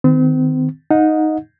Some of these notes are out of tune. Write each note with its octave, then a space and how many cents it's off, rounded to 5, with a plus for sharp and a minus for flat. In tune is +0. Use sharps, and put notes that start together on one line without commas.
D#3 +0 C4 -40
D#4 +0 D#5 +0 F#5 -35